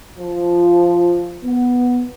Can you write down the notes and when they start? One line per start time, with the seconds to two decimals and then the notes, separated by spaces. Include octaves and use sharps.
0.18 F3
1.44 B3